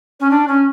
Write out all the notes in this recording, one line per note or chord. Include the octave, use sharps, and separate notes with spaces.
C#4
D4
C#4